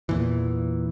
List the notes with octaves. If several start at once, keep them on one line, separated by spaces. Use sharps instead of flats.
E2 A#2 E3